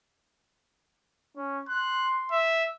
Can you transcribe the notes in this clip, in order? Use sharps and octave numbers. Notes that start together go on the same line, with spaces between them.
C#4
C6 F#6
E5